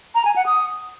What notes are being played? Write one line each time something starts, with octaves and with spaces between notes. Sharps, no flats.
A#5
G#5
F#5
D#6